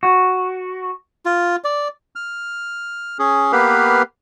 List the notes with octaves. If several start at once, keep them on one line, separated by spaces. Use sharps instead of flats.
F#4
F4
D5
F6
C#4 G#4
A#3 B3 G4 B4 F5